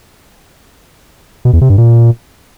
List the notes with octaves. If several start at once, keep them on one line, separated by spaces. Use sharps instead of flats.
B2
E2
C3
G2
A#2